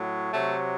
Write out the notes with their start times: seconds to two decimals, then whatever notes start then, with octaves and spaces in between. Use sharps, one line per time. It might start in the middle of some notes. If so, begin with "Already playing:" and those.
Already playing: A2 F#3
0.32 C3 F#3 A3